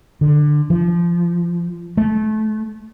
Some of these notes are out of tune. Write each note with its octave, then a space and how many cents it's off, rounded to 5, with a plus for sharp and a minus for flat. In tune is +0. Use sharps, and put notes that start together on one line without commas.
D3 +15
F3 -20
A3 -25